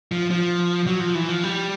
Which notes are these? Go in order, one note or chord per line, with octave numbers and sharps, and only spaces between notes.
F3
F3
F#3
F3
E3
F3
G3